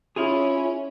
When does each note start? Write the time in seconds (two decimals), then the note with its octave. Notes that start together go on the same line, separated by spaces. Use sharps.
0.16 C#4 E4 F4 G#4